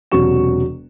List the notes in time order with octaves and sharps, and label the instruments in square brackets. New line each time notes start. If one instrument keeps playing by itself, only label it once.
[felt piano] E1 C3 F#3 F#4 C#6 E7